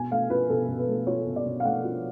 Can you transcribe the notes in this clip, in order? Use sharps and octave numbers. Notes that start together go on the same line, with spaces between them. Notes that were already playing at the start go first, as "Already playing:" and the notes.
Already playing: B2 G#5
A3 F5
F4 B4
B2 A4
B2
B4
A3
F4 C#5
B2
D5
B2
F5
A3 F#5
F4